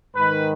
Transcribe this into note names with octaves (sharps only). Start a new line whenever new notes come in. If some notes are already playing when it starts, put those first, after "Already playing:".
G#2 D#3 B4